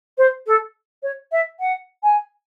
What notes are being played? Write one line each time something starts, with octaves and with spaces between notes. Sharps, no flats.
C5
A4
C#5
E5
F#5
G#5